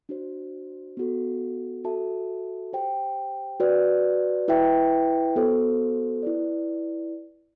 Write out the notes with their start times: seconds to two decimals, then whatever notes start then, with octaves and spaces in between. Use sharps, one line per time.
0.09 D4 F#4 C5
0.97 B3 F#4 A4
1.84 F#4 A4 E5 A5
2.73 G4 C5 G5
3.60 F#4 B4 D5
4.48 E4 B4 E5 G5
5.36 B3 F#4 A4 C5
6.23 E4 B4 D5